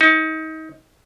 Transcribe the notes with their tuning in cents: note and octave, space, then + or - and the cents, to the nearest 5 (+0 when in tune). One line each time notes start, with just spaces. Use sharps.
D#4 +30